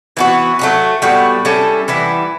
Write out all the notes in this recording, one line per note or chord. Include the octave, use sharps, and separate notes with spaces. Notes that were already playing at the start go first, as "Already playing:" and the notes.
E3 B3 F#4
F#3 A3 C#4 F#4
A2 G3 B3 F#4
G3 C#4 E4 A4
E3 G3 B3 E4